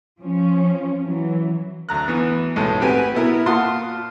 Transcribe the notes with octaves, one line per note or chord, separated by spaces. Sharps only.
F3 C#4
E3 F#3
D2 A#5 F#6
E3 B3
B1 A2 G#3 A3
C4 F#4 G4 B4 G#5
B2 B3 E4 A#4
A#2 F4 F#5 A5 C6 D#6